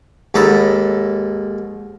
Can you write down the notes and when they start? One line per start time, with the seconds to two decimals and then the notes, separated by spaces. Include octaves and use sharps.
0.34 D#2 G#2 A4 A#5 B5